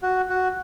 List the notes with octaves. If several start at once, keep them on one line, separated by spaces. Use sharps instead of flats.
F#4
F#4